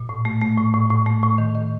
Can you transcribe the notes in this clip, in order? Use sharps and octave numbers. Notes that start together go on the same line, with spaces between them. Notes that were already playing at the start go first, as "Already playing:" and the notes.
Already playing: A#2
A2
A3
A3
A2
A2
A2
A3
A2
D#3
D#3